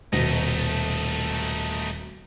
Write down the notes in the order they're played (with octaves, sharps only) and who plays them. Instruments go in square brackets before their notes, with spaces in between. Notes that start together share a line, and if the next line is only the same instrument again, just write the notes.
[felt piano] D#1 B2 A#6 [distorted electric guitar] A3 D#4